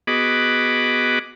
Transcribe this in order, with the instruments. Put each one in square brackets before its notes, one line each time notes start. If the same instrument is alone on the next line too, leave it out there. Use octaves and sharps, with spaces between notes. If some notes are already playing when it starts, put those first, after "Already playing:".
[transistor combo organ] B3 F#4 G#4 D#5 B5 D6